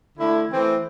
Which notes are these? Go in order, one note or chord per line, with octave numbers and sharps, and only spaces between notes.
D3 A3 E4
E3 A3 C4